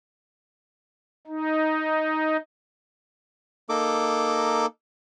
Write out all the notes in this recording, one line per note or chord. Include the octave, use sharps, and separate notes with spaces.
D#4
A#3 D#4 A4 D6